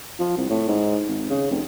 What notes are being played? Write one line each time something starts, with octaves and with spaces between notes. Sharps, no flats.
F3
C2
A2
G#2
G#1
C#3
F1